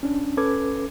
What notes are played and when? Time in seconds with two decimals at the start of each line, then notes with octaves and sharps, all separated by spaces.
0.03 C#4 D4
0.37 C#4 A4 B4 D6 G#6